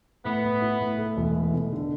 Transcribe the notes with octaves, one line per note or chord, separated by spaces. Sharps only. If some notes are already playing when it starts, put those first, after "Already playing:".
A2 B3
A2
E4
A2
A3
E1
A3
B2
D3